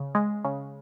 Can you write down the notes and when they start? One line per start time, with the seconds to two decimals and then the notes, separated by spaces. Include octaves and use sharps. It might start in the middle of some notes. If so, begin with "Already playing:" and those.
Already playing: C#3
0.15 G#3
0.45 C#3